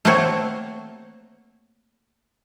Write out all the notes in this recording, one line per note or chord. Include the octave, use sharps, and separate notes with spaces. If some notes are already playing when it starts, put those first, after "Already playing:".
A3 A#3 C4 F#4 C5 C#5